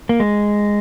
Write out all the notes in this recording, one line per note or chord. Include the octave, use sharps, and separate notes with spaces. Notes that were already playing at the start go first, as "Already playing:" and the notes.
A#3
G#3